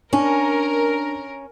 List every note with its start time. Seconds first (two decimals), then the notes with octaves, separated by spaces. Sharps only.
0.13 C#4 D4 A#4